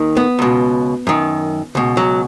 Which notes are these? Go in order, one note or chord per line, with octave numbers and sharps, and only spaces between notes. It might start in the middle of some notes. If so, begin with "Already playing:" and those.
Already playing: D#2 D#3
B3
C#2 B2
F#2 D#3
C#2 B2
F#3